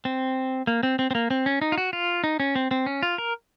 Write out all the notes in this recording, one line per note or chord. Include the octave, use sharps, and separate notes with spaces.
C4
A#3
C4
C4
C4
A#3
C4
C#4
D#4
F4
F#4
F4
D#4
C#4
C4
C4
C#4
F4
A#4